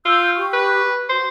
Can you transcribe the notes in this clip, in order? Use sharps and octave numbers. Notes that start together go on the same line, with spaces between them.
F4 E6 G6
G4 C#6
B4
F#4 C5